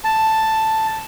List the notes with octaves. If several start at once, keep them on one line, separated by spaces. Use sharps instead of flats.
A5